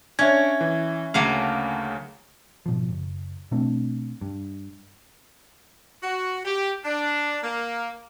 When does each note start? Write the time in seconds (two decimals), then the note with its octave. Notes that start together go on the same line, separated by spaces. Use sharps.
0.19 C#4 D4 C#5 E5 G#6
0.61 E3
1.14 D2 C#3 F#3 A#3 F5 A5
2.66 G#1 B2 F3
2.89 F#1
3.51 B2 A3 C4 D4
4.21 G2
6.03 F#4
6.44 G4
6.84 D4
7.43 A#3